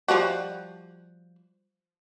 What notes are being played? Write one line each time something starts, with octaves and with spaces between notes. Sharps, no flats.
F3 G3 F#4